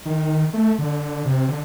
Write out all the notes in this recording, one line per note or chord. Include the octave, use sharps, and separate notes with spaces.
D#3
A3
D3
C3
D3